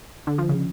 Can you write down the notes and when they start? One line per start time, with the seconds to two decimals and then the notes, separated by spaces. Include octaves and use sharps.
0.27 D3
0.38 F3
0.49 C#3